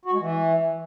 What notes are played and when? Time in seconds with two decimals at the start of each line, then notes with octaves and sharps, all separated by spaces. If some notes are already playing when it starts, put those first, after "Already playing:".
0.05 F#4
0.13 G#3
0.20 E3